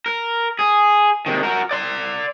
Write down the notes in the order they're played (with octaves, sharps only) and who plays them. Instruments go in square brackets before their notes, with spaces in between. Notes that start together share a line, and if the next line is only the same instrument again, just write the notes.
[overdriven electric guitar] A#4
G#4
C3 D#3
F#4 A#4
D5 C6